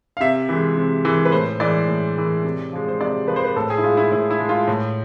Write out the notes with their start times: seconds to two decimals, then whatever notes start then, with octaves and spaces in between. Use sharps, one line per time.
0.17 F5
0.21 C3 E5
0.49 E3 G#3
0.77 C3
1.05 E3 G#3
1.25 B4
1.32 A2 C5
1.60 E3 G#3 D5
1.88 A2
2.16 E3 G#3
2.44 C3
2.73 F3 G#3
2.88 C5
3.00 C3 D5
3.28 F3 G#3 B4
3.36 C5
3.44 B4
3.56 A2 A4
3.70 G#4
3.78 E4
3.84 G#3 F4
3.97 E4
4.12 A2 E4
4.31 E4
4.40 G#3
4.49 F4
4.68 A2